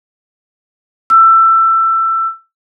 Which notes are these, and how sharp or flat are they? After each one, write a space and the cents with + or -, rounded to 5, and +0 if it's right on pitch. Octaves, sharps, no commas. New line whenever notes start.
E6 +20